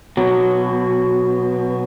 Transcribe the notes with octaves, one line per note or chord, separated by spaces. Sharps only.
B2 F#3